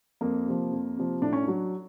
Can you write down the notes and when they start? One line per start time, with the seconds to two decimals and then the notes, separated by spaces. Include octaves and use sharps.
0.21 F2 A#3
0.47 C3 F3
0.72 F2
0.97 C3 F3
1.22 A2 D4
1.33 C#4
1.43 F#3 D4